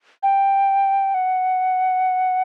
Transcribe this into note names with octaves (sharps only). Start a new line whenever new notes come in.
G5
F#5